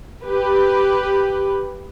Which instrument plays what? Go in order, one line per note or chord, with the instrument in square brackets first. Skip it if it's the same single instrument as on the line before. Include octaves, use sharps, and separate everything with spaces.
[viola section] G4 B4